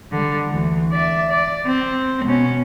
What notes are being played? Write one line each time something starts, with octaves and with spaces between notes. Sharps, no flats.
D3 G3
D2 E3
D5 E5
D5
C4
B2 C#4